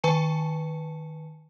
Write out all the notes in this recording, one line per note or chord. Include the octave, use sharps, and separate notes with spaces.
D#3 B4 G#5 A5 C#7